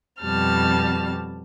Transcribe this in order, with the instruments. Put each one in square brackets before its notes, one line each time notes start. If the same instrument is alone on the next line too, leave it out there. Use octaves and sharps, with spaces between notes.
[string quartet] F2 B2 G3 A5 F6